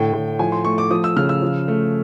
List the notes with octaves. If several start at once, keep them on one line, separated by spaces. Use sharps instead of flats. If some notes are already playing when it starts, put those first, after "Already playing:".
Already playing: A2 D3 G5
A2
F3 G#5
C6
A3 C#6
D6
F3 D#6
E6
C#3 F6
E6
F3
A3